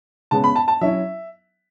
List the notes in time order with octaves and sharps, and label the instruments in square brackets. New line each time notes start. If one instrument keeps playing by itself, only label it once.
[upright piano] C#3 G#3 B3 A5
B5
A5
A5
F#3 C#4 E4 E5